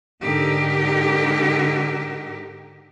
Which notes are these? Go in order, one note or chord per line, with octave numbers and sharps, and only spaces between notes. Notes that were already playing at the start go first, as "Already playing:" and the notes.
G#2 D3 D#4 G4 A#4